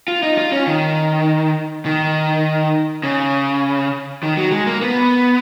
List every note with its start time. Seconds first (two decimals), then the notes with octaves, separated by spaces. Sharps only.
0.08 F4
0.23 D#4
0.38 F4
0.52 C#4
0.67 D#3
1.86 D#3
3.03 C#3
4.23 D#3
4.37 F#3
4.52 G#3
4.67 A#3
4.82 B3